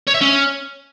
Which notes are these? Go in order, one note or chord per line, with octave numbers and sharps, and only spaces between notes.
C#5
E5
C#4